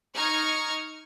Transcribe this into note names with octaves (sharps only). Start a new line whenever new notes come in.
D#4 A#5 C#6 F6 G#6